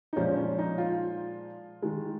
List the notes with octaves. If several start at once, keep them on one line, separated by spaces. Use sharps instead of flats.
D#4
A#2 F3 G#3 C#4
C#4
D#4
F4
D#3 G#3